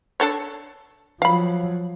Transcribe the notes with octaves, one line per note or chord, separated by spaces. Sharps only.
D4 A4 C#5
F3 F#3 F5 B5